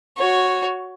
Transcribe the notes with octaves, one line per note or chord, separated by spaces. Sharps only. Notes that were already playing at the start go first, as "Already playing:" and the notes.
F#4 C#5